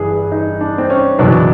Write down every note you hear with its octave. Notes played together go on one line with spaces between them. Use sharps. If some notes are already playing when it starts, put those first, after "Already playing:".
Already playing: G1 G2 E3 G#4
D#4
D4
C4
C#4
F#1 E2 B2 F#3 D4